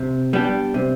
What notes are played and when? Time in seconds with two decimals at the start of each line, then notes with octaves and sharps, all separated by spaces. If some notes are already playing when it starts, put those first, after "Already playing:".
Already playing: C3
0.33 G3 B3 D4 G4
0.74 C3